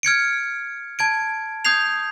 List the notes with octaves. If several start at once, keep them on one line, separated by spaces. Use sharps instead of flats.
F6 G#6 C#7 D7
A5 G#6 D7
D#6 G6 G#6 C7 F7